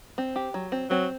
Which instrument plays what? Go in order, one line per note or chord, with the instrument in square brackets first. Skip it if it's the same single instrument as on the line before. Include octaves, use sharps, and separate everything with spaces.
[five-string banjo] C4
G4
F#3
C4
[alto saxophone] F#3 [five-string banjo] C4